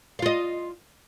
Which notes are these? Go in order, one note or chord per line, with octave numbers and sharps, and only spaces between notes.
F4 D#5 F5